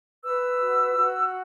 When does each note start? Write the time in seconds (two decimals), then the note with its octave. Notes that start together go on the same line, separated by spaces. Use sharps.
0.24 B4 E6
0.60 F#4
0.96 F#4